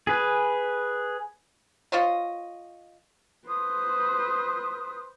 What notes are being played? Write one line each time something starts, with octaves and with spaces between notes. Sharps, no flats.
G#4 B4
F4 C5 C#5 D#5
B4 C5 C6 D#6